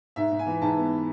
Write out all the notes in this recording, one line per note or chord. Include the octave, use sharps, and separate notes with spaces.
G#2 E5
G#2
G#5
E3
G#2 A5
B3